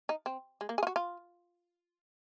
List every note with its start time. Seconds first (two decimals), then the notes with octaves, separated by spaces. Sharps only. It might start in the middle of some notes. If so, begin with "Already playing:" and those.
0.09 D#4
0.26 C4
0.61 G#3
0.69 A#3
0.78 G#4
0.83 F4
0.87 F#4
0.96 F4